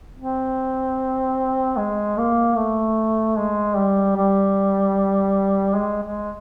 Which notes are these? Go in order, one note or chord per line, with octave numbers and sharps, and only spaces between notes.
C4
G#3
A#3
A3
G#3
G3
G3
G#3
G#3